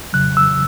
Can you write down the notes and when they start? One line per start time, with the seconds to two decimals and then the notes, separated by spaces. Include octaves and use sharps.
0.13 F2 C#3 F#3 F#6
0.37 E6